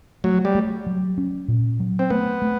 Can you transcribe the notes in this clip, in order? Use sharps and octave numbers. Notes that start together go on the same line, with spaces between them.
F#3 A3
G3
A3
F#3
C#4
A#2
F#3
C4
A3 B3
A3